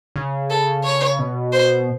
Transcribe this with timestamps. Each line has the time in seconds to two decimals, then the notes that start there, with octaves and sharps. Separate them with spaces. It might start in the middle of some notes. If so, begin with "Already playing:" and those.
0.16 C#3
0.50 A4
0.84 C#5
1.19 B2
1.53 C5